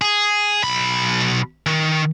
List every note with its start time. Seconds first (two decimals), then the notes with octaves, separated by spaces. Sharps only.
0.01 G#4
0.63 B1 B5
1.66 D#3